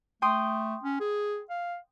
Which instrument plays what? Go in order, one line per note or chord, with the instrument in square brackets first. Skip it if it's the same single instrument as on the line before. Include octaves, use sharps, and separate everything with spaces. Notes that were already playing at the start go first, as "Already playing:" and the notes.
[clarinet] A3 [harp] G5 C6 D#6
[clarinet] C#4
G#4
F5